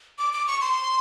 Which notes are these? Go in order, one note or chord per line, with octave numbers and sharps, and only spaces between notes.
D6
D6
C#6
C6